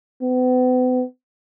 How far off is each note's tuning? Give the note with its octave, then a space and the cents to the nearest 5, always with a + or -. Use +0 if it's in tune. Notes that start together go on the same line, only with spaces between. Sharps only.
B3 +40